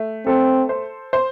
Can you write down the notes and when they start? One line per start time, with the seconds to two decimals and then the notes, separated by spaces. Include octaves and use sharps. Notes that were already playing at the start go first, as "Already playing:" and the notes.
Already playing: A3
0.27 C4 A4
0.69 C5
1.13 C5